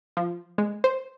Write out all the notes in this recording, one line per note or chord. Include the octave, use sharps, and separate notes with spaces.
F3
G#3
C5